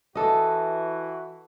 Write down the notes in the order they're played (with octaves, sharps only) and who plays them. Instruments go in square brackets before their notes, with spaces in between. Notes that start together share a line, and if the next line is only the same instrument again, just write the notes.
[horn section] E3 F#4 [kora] A4 D#5